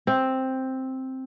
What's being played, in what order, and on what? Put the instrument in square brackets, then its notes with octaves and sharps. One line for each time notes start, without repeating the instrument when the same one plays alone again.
[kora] C4